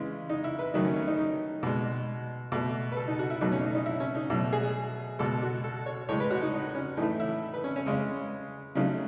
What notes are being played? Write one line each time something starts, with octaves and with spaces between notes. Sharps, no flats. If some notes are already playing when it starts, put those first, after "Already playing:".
Already playing: C#3 E3 G#3
D#4
E4
B4
D#3 F#3 A3 D#4
C#4
C#4
D#4
D#4
B2 G#3
B2 A3
B4
A4
D#4
F#4
E4
B2 F#3 A3 D#4
C#4
D#4
D#4
E4
C#4
D#4
B2 F#3 A3 E4
G#4
B2 G#3 A4
F#4
A4
C#5
A2 G#3 C#5
B4
F#4
D#4
D#4
C#4
A2 E3 A3 D#4
E4
B4
C#4
C#4
C#3 G#3
C#3 F#3 A3 D#4